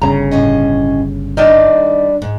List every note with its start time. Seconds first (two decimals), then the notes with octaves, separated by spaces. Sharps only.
0.02 G1 C#3 A#5
0.31 A2 C#4 D#5
1.37 D#3 G3 D4 D5 D#5
2.22 G#2